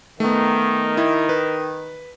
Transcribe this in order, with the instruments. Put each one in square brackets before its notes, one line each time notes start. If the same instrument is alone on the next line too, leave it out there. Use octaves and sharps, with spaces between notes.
[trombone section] D#3 [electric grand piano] A3 B3
[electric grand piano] E4
B4